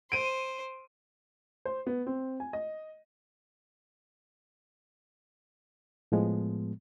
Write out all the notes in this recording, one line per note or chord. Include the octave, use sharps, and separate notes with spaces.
C5 D7 D#7
C5
B3
C4
G#5
D#5
A2 F3 G#3 B3